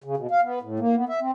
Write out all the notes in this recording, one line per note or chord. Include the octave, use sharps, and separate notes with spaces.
C#3
B2
F5
B3
A2
A#3
B3
E5
C4